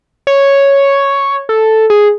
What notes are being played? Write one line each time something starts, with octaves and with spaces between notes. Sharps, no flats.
C#5
A4
G#4